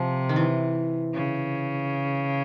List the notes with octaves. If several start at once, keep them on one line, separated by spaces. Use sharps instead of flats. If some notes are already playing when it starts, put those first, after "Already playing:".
Already playing: C3 F3
D#3
E3
C#3